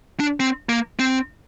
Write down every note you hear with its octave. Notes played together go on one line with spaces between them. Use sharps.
D4
C4
A#3
C4